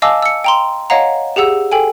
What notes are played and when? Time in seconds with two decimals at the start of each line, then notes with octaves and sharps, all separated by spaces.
0.02 D#5 F5 G#5 A5 D6 E6
0.22 E6 C#7
0.44 G5 A#5 C6
0.90 C#5 D#5 F5 F#5 A#5
1.36 G4 G#4 F#5 E6
1.71 A4 G5 G#5